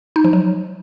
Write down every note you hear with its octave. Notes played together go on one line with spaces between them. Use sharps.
D#4
F3
F#3